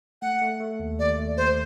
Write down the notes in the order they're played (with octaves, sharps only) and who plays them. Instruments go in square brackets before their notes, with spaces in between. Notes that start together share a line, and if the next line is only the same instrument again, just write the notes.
[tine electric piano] A3 [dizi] F#5
[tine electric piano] A3
A3
D#2
[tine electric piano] D#2 [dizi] D5
[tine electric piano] A3
[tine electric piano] D#2 [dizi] C5